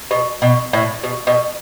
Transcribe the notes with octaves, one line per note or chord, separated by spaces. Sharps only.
B2
B2
A2
B2
B2